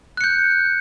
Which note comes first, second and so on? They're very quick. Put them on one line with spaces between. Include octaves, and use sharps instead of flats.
F#6 C#7 G6